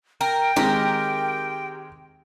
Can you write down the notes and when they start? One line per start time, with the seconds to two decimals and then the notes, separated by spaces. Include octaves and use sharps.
0.21 A#4 G5
0.56 D#3 G#3 C4 G4 A#4